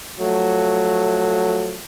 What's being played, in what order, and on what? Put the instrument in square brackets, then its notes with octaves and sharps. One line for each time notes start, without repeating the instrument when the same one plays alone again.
[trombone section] F3 F#3 A3